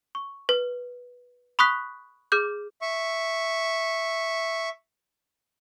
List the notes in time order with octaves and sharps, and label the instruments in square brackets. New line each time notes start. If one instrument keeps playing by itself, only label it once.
[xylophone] C#6
B4
B5 C#6 D#6 F#6 B6
G#4 D6 F6 G6
[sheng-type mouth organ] E5 C#6